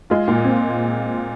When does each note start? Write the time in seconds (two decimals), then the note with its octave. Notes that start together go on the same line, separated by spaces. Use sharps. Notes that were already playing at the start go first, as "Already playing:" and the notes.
0.10 G#3 F4
0.28 A#2
0.45 C4